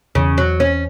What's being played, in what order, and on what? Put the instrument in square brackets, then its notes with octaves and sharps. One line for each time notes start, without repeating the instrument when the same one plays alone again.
[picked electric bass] E2 E3 [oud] C#3
[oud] F#3
C#4